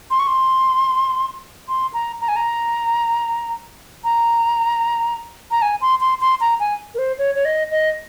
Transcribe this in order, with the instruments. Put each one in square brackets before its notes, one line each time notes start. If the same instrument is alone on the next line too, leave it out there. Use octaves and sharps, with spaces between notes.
[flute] C6
C#6
C6
C6
A#5
A#5
G#5
A#5
A#5
A#5
G#5
C6
C6
C6
A#5
G#5
A#4
C5
C#5
C#5
D#5
D#5